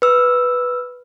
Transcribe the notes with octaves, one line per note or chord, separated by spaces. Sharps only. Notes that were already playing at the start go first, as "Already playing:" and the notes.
B4 E6